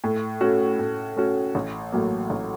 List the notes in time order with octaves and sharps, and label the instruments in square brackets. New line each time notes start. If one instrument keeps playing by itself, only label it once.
[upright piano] A2
A3 C#4 F#4
A2
A3 C#4 F#4
A1
A2 F#3 A#3
A1